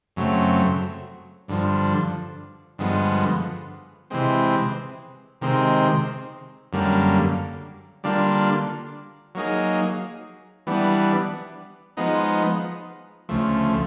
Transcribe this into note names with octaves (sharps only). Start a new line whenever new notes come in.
F#2 C#3 F#3 A3 C4
G2 D3 F3
G2 D3 F3 G#3 B3
C3 E3 G#3 C4
C3 D#3 G#3 C4
F#2 D3 G3 A#3
D3 G3 A#3 D4 F4
F#3 A#3 D#4 G#4
E3 G3 B3 D4
F3 G#3 B3 D#4
D2 C#3 F3 A3